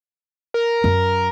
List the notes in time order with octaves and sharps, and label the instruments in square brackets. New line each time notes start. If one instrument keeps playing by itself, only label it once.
[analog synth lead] A#4
[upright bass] F#2